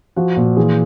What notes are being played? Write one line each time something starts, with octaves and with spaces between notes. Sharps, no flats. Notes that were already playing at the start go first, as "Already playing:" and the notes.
F3 F#4
A#2
E3 G#4